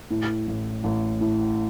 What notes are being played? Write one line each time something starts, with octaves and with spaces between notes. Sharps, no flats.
A2
A1
A1
A2